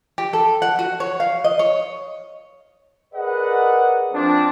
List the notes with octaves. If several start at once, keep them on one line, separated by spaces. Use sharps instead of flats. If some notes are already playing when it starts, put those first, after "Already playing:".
G4
A4
F#5
F#4
C#5
F5
D#5
C#5
G#4 A#4 B4 D5 D#5 F#5
F3 C4 D4